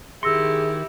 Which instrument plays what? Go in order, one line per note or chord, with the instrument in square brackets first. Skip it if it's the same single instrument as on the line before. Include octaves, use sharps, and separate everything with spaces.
[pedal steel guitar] D#3 C6 [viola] E4 G4 [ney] G#4 [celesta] E6 A#6 C#7